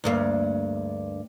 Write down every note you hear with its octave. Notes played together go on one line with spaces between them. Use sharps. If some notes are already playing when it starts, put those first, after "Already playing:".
D2 G2 A#3